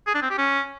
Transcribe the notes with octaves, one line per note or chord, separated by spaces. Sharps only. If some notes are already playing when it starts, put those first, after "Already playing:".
G#4
D4
C4
G4
C#4